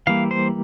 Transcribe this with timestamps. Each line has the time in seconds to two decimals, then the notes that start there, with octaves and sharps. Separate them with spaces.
0.07 E3 G3 A#3 F5
0.31 C5